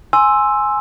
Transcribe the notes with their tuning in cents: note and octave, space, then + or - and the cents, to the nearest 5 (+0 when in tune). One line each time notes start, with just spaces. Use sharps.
G#5 +5 C6 +10 E6 +0